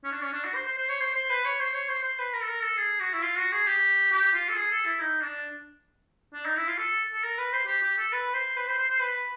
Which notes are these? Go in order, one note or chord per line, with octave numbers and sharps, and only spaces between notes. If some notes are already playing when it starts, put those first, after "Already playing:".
C#4
D4
C#4
D4
F#4
C5
C5
C5
C#5
C5
C5
B4
C#5
C5
C#5
C5
C5
B4
A#4
A4
A#4
A4
G#4
F#4
E4
F4
F#4
G#4
G4
G4
F4
A4
G#4
A4
E4
D#4
D4
D4
D#4
E4
F4
A4
A4
A#4
B4
C5
G4
G4
A4
B4
C5
B4
C5
C5
C5
B4